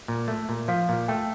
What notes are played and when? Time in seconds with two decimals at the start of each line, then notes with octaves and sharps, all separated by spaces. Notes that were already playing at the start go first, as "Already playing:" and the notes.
0.08 A#2
0.28 A3
0.49 A#2
0.68 F3 F5
0.89 A#2
1.08 A3 G5